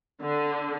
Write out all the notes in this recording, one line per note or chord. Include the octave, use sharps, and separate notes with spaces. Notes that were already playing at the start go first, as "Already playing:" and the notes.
D3